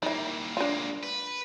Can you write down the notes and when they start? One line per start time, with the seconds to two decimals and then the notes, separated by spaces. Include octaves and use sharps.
0.03 D#3 G3 A#3 E4
0.57 G#3 A#3 D4 F4
1.03 B4